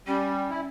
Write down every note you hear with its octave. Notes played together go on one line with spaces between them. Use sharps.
G3 C#4
E4